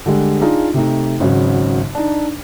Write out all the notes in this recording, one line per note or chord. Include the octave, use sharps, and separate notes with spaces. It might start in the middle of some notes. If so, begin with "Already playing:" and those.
D3 G3 G#3
D4 D#4 F4 G#4
C3 A3 D#4
G#1 C#3 F#3
D4 D#4